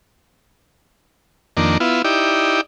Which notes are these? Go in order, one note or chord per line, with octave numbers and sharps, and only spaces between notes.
F2 D#3 A#3 D4
B3 E4 F4
D#4 E4 G4 D5